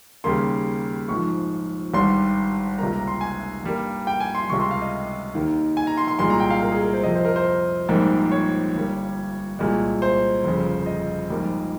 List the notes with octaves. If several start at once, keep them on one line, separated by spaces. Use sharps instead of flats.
D#2 C#3 G3 A#3 C6
A#1 G#2 F3 C#6
G#1 G2 G3 C6
C#2 C3 G3 A#3 A#5
A#5
C6
G#5
G2 G3 A#3
G5
G#5
C6
C#2 C3 G3 C#6
C6
F5
D#5
D#2 D#3 A#3
G#5
A#5
C6
C6
C2 A#2 G#3 C6
A#5
G5
F5
A#4
G#4
A#4
C5
F2 C3 F3 D#5
C5
A#4
C5
A#1 G#2 G3 A#3
C#5
G1 G2 G3 A#3
C2 A#2 G#3
C5
G1 F2 C#3
D#5
A#1 G#2 G3 A#3